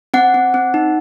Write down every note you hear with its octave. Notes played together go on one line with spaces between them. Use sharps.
C4 F#5
C4
C4
D#4